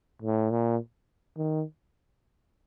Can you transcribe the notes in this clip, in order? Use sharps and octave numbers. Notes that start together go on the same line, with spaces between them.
A2
A#2
D#3